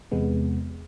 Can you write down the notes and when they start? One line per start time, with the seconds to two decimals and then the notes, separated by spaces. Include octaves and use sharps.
0.12 E2 C3 G#3 B3